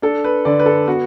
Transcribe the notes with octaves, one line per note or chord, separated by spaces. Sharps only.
D4 A4
B4
D3 D5
B4
A4
B3 F#4